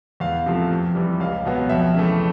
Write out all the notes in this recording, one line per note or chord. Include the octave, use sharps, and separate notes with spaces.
E2 F5
C3 F3 A3
F2
C3 E3 G3
C#2 F5
B2 F#3 B3
F2 E5
C#3 E3 A3